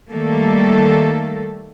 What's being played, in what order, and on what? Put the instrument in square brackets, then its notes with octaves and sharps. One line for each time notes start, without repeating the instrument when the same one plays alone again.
[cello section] D#3 G3 A3 A#3 A4